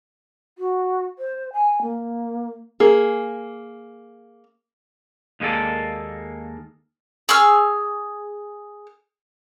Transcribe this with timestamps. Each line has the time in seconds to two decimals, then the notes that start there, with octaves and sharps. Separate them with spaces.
0.58 F#4
1.19 C5
1.53 G#5
1.82 A#3
2.80 A#3 G#4
5.40 D#2 G#3 A#3 C#4 A4 D5
7.29 G#4 C#6 E6 F6